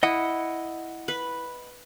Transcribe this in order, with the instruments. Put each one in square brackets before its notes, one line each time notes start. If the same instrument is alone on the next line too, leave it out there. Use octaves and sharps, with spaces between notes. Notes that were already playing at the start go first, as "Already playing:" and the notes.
[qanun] E4 [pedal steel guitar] D#5 F#5 D#6
[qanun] B4